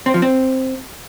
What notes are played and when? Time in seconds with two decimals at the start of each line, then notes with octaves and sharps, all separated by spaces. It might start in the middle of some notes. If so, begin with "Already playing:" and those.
0.06 C4
0.14 F3
0.22 C4